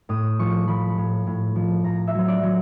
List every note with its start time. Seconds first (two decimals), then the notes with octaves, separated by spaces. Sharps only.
0.09 A2 D#6
0.39 F3 C#6
0.68 F3 B5
0.98 A2
1.27 A2
1.56 F3
1.84 A2 A#5
2.07 E5
2.14 F#3
2.28 D5
2.43 F#3